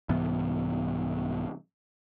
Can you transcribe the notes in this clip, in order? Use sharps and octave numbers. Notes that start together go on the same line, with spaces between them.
C2 G#2 E3 B3